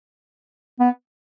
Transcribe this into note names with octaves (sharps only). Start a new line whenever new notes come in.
B3